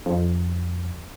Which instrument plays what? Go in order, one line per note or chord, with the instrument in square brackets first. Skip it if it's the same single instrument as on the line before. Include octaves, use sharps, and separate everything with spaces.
[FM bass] F2